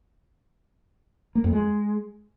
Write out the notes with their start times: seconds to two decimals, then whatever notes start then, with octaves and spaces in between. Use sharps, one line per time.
1.35 A#3
1.44 F2
1.53 G#3